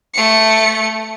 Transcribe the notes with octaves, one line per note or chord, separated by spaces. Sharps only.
A3 C#7